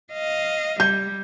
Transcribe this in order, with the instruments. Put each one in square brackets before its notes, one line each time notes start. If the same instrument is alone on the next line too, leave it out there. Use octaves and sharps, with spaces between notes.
[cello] D#5 F5
[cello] G3 [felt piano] G6